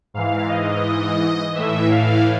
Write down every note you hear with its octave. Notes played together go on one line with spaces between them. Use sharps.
G#2 E3 F5
D#5
A2 E3 E5
F5